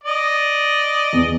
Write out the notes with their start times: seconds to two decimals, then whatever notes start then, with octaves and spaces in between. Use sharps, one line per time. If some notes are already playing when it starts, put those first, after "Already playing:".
0.04 D5 D#5
1.13 E2